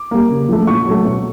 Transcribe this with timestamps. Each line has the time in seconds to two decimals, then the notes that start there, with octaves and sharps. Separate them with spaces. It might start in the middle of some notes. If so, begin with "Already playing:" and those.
Already playing: D6
0.11 G3 A#3
0.30 C#3
0.49 F3 A3
0.67 A#2 C#6
0.87 F#3 A3
1.05 B2